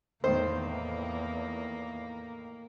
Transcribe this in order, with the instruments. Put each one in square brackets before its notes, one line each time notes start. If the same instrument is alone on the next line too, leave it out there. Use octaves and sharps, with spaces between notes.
[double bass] E2 [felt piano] A2 D#3 [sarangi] A#3 [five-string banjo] C5